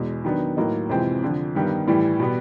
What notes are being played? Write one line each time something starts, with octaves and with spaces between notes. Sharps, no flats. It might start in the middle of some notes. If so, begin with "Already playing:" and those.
Already playing: E2 B2 G#3
D#3 F#3 B3 D4
A2 F#3 A#3 D#4
F2 C3 E3 G#3 C4
F2 D3 F3
G2 D#3 G3 B3
A2 E3 G3
B2 G3 B3